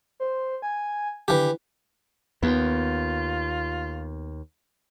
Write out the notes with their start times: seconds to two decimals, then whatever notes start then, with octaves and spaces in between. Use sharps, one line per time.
0.20 C5
0.62 G#5
1.28 D3 E3 G4
2.43 D#2 B3 F4